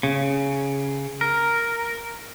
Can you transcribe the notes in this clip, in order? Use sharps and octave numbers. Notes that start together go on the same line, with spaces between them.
C#3
A#4